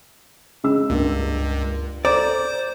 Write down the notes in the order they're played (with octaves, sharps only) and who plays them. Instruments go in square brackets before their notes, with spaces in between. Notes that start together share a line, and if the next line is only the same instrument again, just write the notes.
[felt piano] C#3 G#3 E6
[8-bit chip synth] C#2 [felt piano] G2 A#3
[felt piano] A4 A#5 [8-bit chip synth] C5 [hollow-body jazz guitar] D5